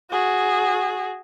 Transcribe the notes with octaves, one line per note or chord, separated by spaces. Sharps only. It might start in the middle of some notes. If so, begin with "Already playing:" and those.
F#4 G#4